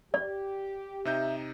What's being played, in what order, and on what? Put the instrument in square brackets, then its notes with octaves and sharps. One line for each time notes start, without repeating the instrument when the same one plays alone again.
[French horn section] G4 [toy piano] D5
[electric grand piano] C3 D#4 G6 [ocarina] E5